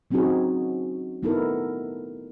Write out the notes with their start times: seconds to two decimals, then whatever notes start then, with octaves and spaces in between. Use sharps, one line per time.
0.11 F#3 C4 C#4 D#4 F#4 G#4
1.23 A3 B3 D#4 E4 A4 A#4